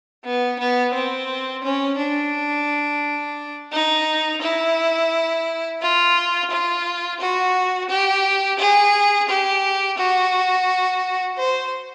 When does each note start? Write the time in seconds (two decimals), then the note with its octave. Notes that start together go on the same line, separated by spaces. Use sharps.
0.24 B3
0.59 B3
0.93 C4
1.63 C#4
1.97 D4
3.72 D#4
4.41 E4
5.81 F4
6.50 F4
7.19 F#4
7.89 G4
8.58 G#4
9.28 G4
9.97 F#4
11.37 C5